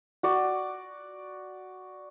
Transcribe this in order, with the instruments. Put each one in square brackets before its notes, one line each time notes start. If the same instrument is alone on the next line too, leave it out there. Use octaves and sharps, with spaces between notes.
[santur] F#4 D5